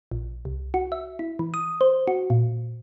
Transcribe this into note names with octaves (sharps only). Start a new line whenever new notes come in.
A#1
C2
F#4
E5
E4
E3
D#6
C5
F#4
A#2